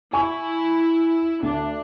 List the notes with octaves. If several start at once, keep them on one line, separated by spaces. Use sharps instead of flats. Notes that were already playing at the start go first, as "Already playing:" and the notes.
E4 G#5 C#6
D2 D4